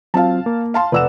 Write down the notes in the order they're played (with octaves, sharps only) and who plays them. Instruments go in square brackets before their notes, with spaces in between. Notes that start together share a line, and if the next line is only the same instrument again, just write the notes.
[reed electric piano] F#3 C4 F4 [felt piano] F5 A5
[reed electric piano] A#3
[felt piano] F5 A5 C6
[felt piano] F1 E6 E7 [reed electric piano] B4 D5 F#5